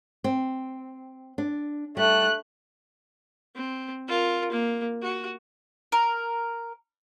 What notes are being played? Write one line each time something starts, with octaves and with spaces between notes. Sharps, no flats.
C4
D4
G3 A3 F#6
C4
F4 A#4
A#3
F#4
A#4